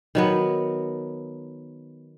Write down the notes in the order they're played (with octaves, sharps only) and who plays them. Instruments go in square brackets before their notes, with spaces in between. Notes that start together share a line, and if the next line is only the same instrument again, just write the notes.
[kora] D#3 F#3 B3